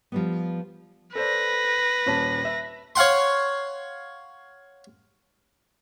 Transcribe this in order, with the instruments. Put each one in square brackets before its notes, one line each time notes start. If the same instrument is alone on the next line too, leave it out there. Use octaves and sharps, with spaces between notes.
[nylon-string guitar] F3 G3 B3
[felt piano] A4 C5 D5 [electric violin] B4 A#6
[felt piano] D#1 C#4 A5
E5
[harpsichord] C#5 F5 F#5 C6